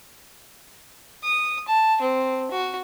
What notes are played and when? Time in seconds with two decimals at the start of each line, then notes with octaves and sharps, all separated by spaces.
1.24 D#6
1.68 A5
2.01 C4
2.51 F#4